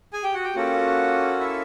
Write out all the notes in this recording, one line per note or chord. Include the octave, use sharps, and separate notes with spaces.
G#4 G#5
G4 G5
F#4 F#5
G4 G5
A#3 C#4 F4 F#4 A4 F#5
E4 E5